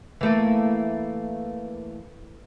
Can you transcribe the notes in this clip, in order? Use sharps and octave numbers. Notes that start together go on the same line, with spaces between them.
E3 A3 A#3